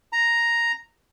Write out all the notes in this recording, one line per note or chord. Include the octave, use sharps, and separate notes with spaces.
A#5